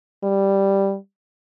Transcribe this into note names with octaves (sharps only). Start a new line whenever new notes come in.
G3